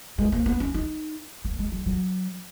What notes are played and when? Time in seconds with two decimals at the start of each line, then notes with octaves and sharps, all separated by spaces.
0.18 G#3
0.32 A#3
0.46 B3
0.60 C#4
0.74 D#4
1.45 A#3
1.59 G#3
1.72 F#3
1.86 F#3